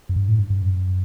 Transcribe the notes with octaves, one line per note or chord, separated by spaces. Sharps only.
F#2
G2
A2
G2
G2
F#2